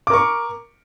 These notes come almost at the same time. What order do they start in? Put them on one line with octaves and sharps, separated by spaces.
D6 A#4 C#6